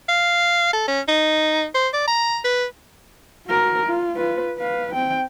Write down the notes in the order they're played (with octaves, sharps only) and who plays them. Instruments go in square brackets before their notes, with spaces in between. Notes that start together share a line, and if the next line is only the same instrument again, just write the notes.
[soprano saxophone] F5
A4
C#4
D#4
C5
D5
A#5
B4
[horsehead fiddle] F#4 A#4
F4
F4 B4
B4 F5
C4 G5